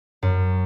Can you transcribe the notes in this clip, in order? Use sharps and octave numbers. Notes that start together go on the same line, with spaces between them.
F#2